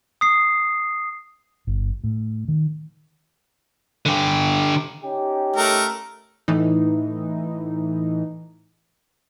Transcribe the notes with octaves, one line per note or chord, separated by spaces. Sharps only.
D#6 C7
G1
A2
D#3
D3 G4
C#4 D#4 G4
A3 A#4
A2 E3 D#4